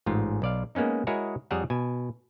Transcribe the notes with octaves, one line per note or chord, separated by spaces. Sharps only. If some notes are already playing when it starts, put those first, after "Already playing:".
A1 G#2 F4
B1 D5 F5
G#3 A#3 B3 C#4 D#4
G#3 E4 F#4 G#4 A#4 C#5
F2 G3 G#4 C#5 F#5 A#5
B2 G#5